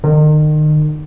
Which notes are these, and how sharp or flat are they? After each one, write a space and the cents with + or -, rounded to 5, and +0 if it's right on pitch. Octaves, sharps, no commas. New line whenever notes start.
D#3 -35